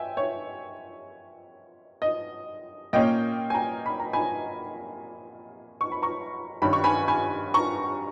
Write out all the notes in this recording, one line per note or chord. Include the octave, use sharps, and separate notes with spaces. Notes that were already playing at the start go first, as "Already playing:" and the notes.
Already playing: E5 G5 G#5
C#5
D#5
A#2 A#3 C#4 D#5 G5
G#5
G5 A#5
B5
A#5
G#5 B5
C#6
B5
A#5 C#6
G2 D#3 G3 C#4 B5
C#6
G#5 B5
G#5 B5
A#5 C#6